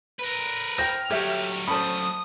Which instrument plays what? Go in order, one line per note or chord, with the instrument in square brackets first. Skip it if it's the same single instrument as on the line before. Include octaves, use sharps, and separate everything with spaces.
[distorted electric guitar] A#4 B4
[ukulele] C5 G5 [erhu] F6 [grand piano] A#6
[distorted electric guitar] F#3 A3 [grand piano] G4 [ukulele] C#5 E5 G5
[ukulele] C#4 A4 [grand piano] C5 A5 B5 [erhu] D#6